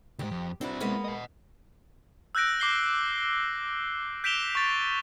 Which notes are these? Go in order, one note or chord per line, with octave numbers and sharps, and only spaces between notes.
D2 G#2 G4
F2
C4 D4 E4 F#4 B4
G#3 A#3 B3
D#5 F#5
E6 F#6 G6 A#6 D7
D6 C7 G7
G6 B6 D7 E7 F7 G7
C#6 A6